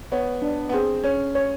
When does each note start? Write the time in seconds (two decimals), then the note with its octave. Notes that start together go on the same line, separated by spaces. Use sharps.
0.12 B3 C#5
0.42 D4
0.69 B3
0.73 C4 G#4
1.04 C#4 C#5
1.35 C#5